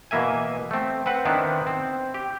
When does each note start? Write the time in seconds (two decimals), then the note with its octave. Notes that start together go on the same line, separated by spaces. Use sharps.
0.11 B2 E3 A#3 E5 G#5
0.71 A3 C4
1.06 C4 B4 F#5
1.25 D#3 B3 C4 D4 E4
1.67 C4
2.14 G4